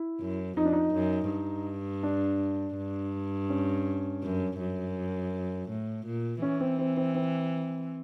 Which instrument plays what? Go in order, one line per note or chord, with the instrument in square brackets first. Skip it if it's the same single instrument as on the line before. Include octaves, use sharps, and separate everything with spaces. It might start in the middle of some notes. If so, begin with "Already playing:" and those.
Already playing: [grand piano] E4
[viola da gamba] F#2
[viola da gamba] F2 [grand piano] D#4
[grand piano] D4
D#4
[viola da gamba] F#2
G2
[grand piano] D4
[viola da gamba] G2
[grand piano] C#4
[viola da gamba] F#2
F#2
A2
A#2
[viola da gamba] E3 [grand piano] C#4
[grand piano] C4
C4
C4
C4